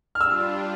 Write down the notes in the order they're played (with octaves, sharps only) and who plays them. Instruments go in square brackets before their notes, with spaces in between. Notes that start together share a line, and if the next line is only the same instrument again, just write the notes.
[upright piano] F6
[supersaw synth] G3 D4 F4 [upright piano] E6